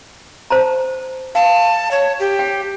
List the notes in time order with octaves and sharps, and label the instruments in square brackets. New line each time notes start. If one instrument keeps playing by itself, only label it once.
[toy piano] C5 A5 A#5
[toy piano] F5 [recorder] A5
[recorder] C#5
G4
[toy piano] G5